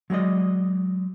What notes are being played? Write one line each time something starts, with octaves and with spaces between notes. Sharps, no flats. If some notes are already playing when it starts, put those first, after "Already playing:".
F#3 G#3 D5 D#5